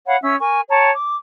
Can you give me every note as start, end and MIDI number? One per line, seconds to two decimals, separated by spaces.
0.07 0.17 73
0.07 0.17 77
0.07 0.17 78
0.07 0.17 83
0.22 0.34 61
0.22 0.34 76
0.22 0.34 88
0.39 0.60 70
0.39 0.60 80
0.39 0.60 85
0.70 0.90 73
0.70 0.90 79
0.70 0.90 81
0.70 0.90 82
0.93 1.16 86